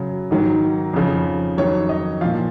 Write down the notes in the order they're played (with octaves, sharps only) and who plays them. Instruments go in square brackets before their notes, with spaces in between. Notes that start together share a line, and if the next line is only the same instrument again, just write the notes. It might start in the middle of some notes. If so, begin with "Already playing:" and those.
Already playing: [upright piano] F#2 C#3 F#3
G#2 D#3 F#3
F2 C#3 F3
F2 D#3 F#3 C#5
D#5
A#2 F3 F5